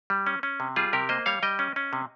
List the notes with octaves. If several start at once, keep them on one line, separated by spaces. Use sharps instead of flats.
G3
C#4
C#4
C3
G3 F4 G#4
C3 G4 A#4
A#3 C5 D#5
G3 C#5 F5
G3 D#5 G5
C#4
C#4
C3